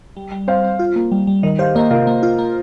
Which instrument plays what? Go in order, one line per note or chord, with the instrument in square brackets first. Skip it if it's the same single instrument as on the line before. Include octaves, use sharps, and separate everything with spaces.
[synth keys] G3
G3
[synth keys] C4 [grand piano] C5 F5
[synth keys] C4
F4
A#3
G3
G3
[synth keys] D#3 [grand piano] A#4 D#5
[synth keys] G4 [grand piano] C5 F5
[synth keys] A#3 [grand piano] A#4 D#5
[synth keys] C3 [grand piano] F4 A#4
[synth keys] A#3
F4
A#3